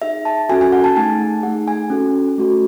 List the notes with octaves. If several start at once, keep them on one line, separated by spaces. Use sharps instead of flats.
D#4 G#4 E5
A5
C#4 F#4 A4 G#5
G#5
F#5
A5
A3 D#4 G#4 G#5
A3 D#4 G#4 F#5
G#5
C#4 F#4 A4
A3 C#4 F#4 A4